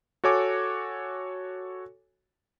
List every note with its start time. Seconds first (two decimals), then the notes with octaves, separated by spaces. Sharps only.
0.24 F#4 A4 C#5 G#5 D6